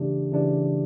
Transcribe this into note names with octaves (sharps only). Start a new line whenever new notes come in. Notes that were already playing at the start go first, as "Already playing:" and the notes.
Already playing: C#3 E3 A3 D4 G4
C#3 E3 A3 D4 G4